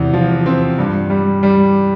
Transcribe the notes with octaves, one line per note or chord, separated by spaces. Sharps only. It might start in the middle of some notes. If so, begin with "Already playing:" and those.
Already playing: E2 C3
F3
C4
G2
G3
G3